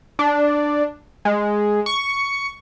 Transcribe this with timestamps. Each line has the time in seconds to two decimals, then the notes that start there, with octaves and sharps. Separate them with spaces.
0.19 D4
1.25 G#3
1.86 C#6